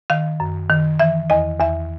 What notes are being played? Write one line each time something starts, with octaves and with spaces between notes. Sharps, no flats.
D#3 F5
F#2
D#3
E3 E5
E2 D#5
E2 E5